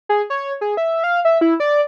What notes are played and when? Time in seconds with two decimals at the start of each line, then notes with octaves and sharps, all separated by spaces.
0.09 G#4
0.30 C#5
0.61 G#4
0.77 E5
1.04 F5
1.25 E5
1.41 E4
1.60 D5